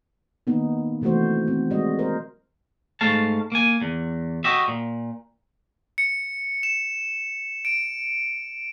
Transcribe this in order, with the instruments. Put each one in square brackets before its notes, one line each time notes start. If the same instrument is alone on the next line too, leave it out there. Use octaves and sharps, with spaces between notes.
[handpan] D#3 A#3 B3 D#4
C3 E3 A3 F#4 C5
C4
G3 G#3 F#4 D#5
A#4 C5
[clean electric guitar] G#2 A3 F5 A5
A#3 G#5
E2
F#4 G4 D#5 E5
A#2
[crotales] C#7
E7
D7